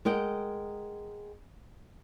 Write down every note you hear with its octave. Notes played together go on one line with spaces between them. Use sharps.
G#3 A#4 D#5 F#5 G5